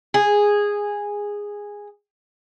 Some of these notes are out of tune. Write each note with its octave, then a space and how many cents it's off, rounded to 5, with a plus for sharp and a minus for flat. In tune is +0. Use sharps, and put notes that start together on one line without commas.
G#4 -10